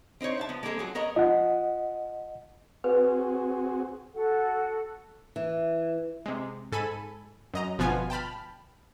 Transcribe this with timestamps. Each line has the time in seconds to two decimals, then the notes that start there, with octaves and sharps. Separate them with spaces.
0.21 C4 D#4 C5 C#5
0.37 E5 F#5 A5
0.49 F3 B3
0.63 G#3 A#3 C4 G#4 A4
0.78 F3 F#3 G#4
0.95 B3 A#4 C#5 D#5
1.16 F3 D#5 F#5
2.84 C4 F#4 G#4 B4
4.14 F#4 A4 F#5
5.36 E3
6.26 C3 G#3
6.72 G#2 A4 G#5 B5 D#7
7.54 F#2 D#5 A#5
7.78 G1 B2 F3 B3 F4 G#5
8.10 G5 A5 B5 F6